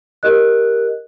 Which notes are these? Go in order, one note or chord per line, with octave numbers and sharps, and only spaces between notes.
G4 A#4 D#5 F#6